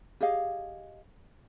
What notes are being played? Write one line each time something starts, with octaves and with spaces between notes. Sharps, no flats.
G4 G#4 D#5 F5